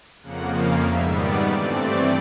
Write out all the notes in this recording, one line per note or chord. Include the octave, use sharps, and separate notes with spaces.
F2 C#3 F3 A#3 F#5
F5
G#2 D#3 G3 B3 E5
D5
G2 E3 A3 C4 D5